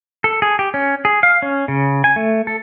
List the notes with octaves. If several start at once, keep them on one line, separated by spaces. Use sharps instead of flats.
A4
G#4
G4
C#4
G#4
F5
C#4
C#3
G#5
A3
A4